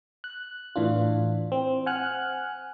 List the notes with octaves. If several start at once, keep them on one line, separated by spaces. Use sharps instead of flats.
F#6
A2 E3 D4 F4
C4
F#5 G#5 F6 F#6